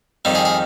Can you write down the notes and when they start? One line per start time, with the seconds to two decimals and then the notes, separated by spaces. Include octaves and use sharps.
0.25 F2 D#3 G3
0.35 G#4
0.45 G#4